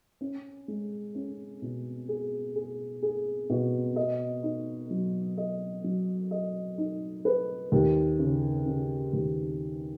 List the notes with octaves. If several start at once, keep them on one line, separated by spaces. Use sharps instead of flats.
C#4
G#3
C#4
B2
G#4
G#4
G#4
B2
D#5
D#4
F#3
D#5
F#3
D#5
D#4
B4
D#2
C#3
C#3
D#2